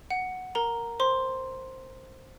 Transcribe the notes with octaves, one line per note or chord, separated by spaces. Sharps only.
F#5
A#4 A#5
C5 C6